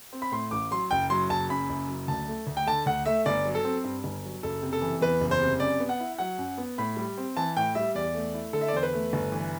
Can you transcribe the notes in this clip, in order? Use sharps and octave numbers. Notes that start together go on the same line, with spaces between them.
C4
B5
A2 C6
A1 D6
F#3 C6
F#1 G5
F#3 C6
F#1 A5
F#2 B5
F#1
F#3
D2 A5
A3
D2
G5
D3 A5
D2 F#5
A3 E5
G1 D5
F#3
A4
C4
G2
G1
F#3
F#1 A4
C3
A4
E3
E2 B4
F#1
C5
C3
F#2 D5
B3
F#5
E4
F#3 F#5
F#2
B3
A2 B5
G3
C4
E3 A5
A2 G5
G3 E5
E2 D5
A3
E4
D3 A4
E5
D5
E2 C5
B4
A3
G1
E3